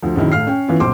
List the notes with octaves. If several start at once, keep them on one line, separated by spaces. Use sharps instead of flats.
D2 F3
A#1 F#2 D#3 E4
A2 F5 F6 C7
C#4 G5
E3 B3 C#4 E4 F4
D#1 B1 C5 C6 D6